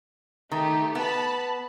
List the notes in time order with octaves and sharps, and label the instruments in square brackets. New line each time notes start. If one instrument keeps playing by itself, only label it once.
[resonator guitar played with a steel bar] D#3 [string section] A3 G4
[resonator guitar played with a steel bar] B3 [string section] A5 B5